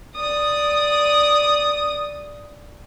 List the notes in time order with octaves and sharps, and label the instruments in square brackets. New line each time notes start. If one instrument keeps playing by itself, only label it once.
[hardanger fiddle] D5 D#6